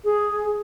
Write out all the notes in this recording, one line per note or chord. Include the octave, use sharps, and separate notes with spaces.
G#4